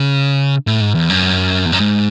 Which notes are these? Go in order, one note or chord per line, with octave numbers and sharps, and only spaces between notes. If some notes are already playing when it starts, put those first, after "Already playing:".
Already playing: C#3
A2
G#2
E2
F#2
E2
F#2
G#2